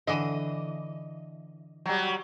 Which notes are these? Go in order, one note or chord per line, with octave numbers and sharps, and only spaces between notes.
D3 E3 D#5
F#3 G3